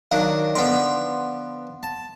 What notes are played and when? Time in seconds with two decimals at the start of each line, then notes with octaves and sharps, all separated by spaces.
0.11 D#3 F#3 D4 F5
0.55 D3 F3 B3 F#5 C6
1.83 A5